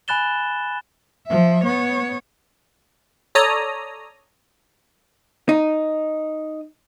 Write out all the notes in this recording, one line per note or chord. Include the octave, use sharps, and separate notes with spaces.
G#5 B5 F#6 A6 E7 G7
F3 E5
B3 C#5
A4 C#5 D5 A#5 D#6
D#4